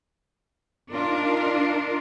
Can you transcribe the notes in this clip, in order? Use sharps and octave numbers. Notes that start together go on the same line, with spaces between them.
D4 D#4 F4 A#4